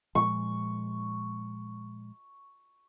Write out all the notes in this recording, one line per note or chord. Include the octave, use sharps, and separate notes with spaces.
A#2 F3 G#3 C#6